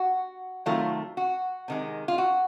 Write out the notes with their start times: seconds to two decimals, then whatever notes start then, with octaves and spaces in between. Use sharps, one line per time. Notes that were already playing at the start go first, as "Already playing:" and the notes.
Already playing: F#4
0.66 C3 D#3 F#3 A3 F4
1.17 F#4
1.68 C3 D#3 G#3
2.08 F4
2.18 F#4